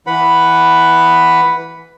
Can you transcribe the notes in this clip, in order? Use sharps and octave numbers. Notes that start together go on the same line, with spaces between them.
E3 B4 F#5 B5